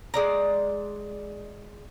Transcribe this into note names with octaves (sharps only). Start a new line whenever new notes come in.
G#3 D5 A#5